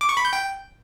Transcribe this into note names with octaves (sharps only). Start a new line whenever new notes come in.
D6
C#6
B5
G6
G5